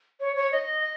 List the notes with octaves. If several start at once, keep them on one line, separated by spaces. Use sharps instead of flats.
C#5
C#5
D#5